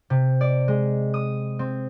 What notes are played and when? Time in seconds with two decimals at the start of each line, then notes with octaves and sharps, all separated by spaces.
0.10 C3
0.41 D5
0.68 G#3
1.14 D#6
1.59 C4